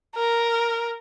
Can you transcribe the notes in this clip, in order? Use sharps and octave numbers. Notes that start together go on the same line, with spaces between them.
A#4